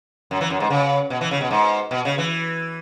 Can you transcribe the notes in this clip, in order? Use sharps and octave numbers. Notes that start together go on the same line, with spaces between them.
F#2
E3
F#2
G#2
C#3
B2
E3
C#3
B2
G#2
B2
C#3
E3